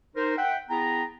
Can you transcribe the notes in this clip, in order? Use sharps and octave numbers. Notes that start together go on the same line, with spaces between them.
D#4 A#4 C5
E5 F#5 G5
B3 E4 G#4 G5 A5 A#5